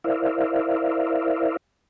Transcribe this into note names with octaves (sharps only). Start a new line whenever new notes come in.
E4 A#4 C5 D5 E5 F5